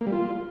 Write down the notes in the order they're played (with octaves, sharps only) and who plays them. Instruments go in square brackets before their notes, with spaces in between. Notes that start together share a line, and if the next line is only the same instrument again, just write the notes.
[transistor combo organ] A#3
G3
F4